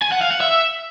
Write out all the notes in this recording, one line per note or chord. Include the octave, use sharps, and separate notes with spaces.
G#5
F#5
F5
F#5
E5